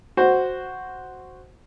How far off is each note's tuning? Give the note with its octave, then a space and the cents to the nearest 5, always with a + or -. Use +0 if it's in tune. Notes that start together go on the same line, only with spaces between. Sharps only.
F#4 +0 C5 +0